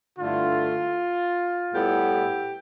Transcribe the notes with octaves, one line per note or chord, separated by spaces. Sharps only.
G2 D3 A3 E4 F4
A2 G3 B3 E4 G4